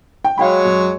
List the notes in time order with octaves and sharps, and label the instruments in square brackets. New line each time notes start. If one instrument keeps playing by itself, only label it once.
[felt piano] G5
[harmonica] F#3 G#3 C#5 [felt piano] F5 G5 B5
[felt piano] F#2